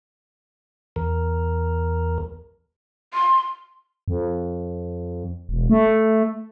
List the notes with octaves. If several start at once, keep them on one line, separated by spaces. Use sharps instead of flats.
E2 A#4
C6
F2
E1
A3